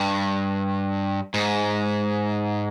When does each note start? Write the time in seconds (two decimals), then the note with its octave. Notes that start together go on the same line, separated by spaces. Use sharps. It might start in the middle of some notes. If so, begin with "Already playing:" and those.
Already playing: G2
1.34 G#2